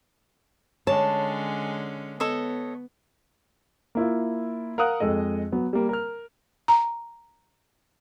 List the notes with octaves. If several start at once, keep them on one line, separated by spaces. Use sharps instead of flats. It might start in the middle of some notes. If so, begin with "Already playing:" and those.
D3 G#3 C#4 C#5 A5
B3 A4 C#5 D#5
A#3 E4 F4
A#4 F5 F#5 D#6 F#6
F2 G#3 A4 D#5
F#3 B3
G3 A#3
A#4 F6
A#5